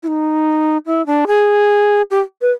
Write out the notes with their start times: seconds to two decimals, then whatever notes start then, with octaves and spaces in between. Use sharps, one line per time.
0.03 E4
0.07 D#4
0.86 E4
1.06 D4
1.27 G#4
2.11 G4
2.41 B4